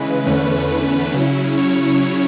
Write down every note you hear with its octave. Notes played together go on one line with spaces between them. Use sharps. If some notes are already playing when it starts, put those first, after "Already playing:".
Already playing: C#3 E3 G#3 B4
E2 D3 A3 C#4 B4
C#3 F#3 C#4 E4
C#5